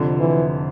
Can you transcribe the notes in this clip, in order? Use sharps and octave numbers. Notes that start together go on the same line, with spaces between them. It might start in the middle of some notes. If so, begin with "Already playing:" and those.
Already playing: F1 F2 D3 F3
E3